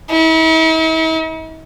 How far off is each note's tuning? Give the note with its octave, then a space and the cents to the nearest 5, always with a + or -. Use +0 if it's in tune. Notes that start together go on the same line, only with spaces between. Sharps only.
E4 -45